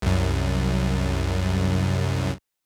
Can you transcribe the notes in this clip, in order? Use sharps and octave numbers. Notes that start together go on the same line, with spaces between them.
C2 F#2